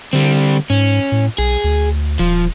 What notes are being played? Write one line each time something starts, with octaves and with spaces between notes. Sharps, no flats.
D3 G3 C4
G#2 C#4
A2
B1 G#4
D2
D#1 F3